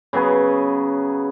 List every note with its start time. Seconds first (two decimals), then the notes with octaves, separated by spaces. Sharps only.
0.13 C#3 F#3 B3 G#4